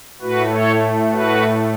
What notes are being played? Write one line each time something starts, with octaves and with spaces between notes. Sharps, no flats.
A2 A3 F#4 B4
A4 C#5
F#4 B4